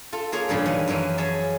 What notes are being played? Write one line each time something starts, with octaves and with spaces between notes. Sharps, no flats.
F4 A4
A#3 F4 G#4 C#5 F5
G2 A#2 C#3 F3
D#3 E3 G3
F#2 E3 F3 C#4 G5
C#4 G#4 A5